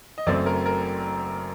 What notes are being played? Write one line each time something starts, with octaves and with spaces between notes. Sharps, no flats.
D#5
F#1 F#2 F#3 A3 C4 D5
A#4
A#4